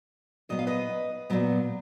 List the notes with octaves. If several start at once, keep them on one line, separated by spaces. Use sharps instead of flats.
A#2 F#3 B3 D#5
F5
B4 D#5
A#2 F#3 B3